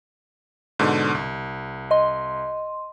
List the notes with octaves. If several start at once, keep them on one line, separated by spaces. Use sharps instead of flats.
G#2 B2 D3
C2
D#5 C6